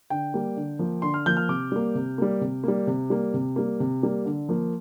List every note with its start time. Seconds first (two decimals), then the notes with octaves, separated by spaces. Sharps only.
0.10 D3 G5
0.34 G3 A#3
0.57 D3
0.79 F3 A#3
1.02 D3 C6
1.14 F6
1.26 F3 A#3 G6
1.37 F6
1.49 C3 D6
1.72 G3 A#3
1.95 C3
2.18 G3 A#3
2.41 C3
2.64 G3 A#3
2.87 C3
3.10 G3 A#3
3.34 C3
3.56 G3 A#3
3.80 C3
4.03 G3 A#3
4.26 D3
4.49 F3 A#3